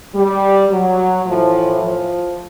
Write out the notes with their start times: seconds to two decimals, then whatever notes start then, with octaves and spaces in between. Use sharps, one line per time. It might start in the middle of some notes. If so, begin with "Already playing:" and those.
0.14 G3
0.71 F#3
1.26 A2 E3 F3
1.82 F3